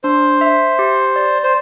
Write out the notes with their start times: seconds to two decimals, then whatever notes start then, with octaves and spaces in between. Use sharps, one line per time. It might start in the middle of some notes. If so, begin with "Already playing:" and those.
0.04 D4 C5
0.41 E5
0.79 G4
1.16 D5
1.44 C5